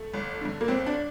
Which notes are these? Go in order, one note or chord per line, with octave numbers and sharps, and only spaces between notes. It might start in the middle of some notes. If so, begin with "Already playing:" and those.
Already playing: A3
G1
G2 D3
A#3
G1 C4
D4